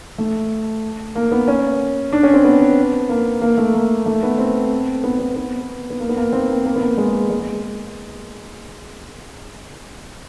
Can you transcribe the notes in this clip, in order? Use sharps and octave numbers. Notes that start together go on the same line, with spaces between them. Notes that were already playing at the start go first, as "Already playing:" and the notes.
A3
A#3
B3
C#4
D4
C#4
C4
B3
A#3
A#3
A3
A#3
A3
B3
C4
B3
B3
B3
B3
A#3
B3
A#3
C4
A#3
A#3
B3
A#3
G#3
G#3